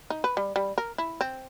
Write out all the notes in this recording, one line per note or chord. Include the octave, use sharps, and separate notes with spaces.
D#4
B4
G3
G3
A#4
E4
C4